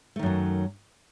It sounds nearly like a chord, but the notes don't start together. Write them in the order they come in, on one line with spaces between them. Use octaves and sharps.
A3 D#3 F#2 F#3